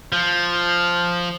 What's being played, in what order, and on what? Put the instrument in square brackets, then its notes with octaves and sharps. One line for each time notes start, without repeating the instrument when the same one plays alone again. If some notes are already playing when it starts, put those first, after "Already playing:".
[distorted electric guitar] F3